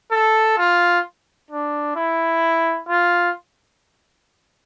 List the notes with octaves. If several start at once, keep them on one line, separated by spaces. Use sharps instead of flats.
A4
F4
D4
E4
F4